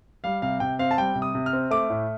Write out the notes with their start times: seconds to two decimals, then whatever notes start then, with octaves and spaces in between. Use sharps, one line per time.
0.24 G3 F5
0.42 C3 F5
0.60 C3 G5
0.79 C4 F5
0.91 A5
0.98 G3 G5
1.15 C3
1.22 D#6
1.35 C3
1.46 F6
1.53 C4
1.71 A3 D6
1.90 A2